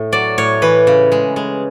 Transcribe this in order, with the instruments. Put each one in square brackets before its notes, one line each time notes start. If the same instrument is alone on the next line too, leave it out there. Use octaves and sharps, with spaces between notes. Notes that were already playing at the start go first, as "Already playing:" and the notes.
Already playing: [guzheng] A2
F#3 D5
A2 C#5
E3 B4
C#3
G#3
G#3